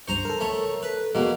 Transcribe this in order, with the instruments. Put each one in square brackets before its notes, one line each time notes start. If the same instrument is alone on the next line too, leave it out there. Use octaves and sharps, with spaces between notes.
[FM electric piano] C#2 G2 C#6 [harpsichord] C5 A#5
[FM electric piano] A4 A#4
[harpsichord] A3 C#5
B4
[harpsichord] E2 B2 A#3 [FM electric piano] G#3